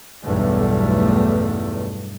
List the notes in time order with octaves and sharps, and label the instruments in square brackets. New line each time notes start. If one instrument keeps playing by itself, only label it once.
[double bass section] B1 E2 G2 A3